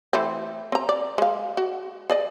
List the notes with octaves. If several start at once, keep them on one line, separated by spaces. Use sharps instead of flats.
E3 A3 C4
C4 A#5
D5
G#3 F5
F#4
G#4 D5 D#5